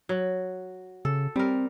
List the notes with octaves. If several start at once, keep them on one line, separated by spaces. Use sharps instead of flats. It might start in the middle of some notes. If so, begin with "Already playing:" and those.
F#3
C#3 A4
G3 C4 A#4